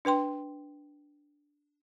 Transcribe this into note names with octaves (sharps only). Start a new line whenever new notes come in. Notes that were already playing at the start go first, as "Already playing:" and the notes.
D4 B4 G5 C6